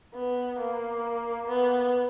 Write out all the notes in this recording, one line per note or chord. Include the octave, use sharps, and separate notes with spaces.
B3
A#3
B3